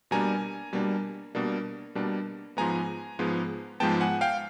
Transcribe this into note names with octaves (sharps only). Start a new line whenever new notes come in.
B2 G3 A#3 D4 G#5 A#5
B2 G3 A#3 D4
B2 G3 A#3 D4
B2 G3 A#3 D4
G#2 F3 G#3 B3 G#5 A#5
G#2 F3 G#3 B3
G#2 F3 G#3 B3 G5 A5
F#5 G#5
F5 G5